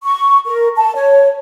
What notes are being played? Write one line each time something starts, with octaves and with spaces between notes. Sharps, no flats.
C#6
A#4
A5
C#5